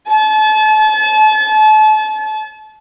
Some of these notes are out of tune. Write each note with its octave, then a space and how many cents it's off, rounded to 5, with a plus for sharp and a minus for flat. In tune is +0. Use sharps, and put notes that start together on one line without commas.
A5 -35